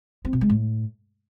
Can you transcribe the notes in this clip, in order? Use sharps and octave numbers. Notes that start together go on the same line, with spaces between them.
C4
B2
G#3
A2